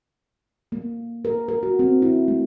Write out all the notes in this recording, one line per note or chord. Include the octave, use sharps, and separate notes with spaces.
A#3
A#4
A#4
F#4
C4
E4
A3